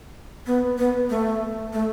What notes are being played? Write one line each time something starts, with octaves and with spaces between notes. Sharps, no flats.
B3
B3
A3
A3